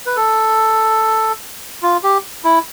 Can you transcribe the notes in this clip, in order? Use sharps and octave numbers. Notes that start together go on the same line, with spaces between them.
B4
A4
F4
G4
E4